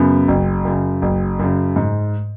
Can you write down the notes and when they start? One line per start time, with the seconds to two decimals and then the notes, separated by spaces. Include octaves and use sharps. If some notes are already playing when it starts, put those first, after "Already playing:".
Already playing: F#2 C#3 B3
0.28 F#1
0.65 F#2 C#3
1.02 F#1
1.39 F#2 C#3
1.76 G#2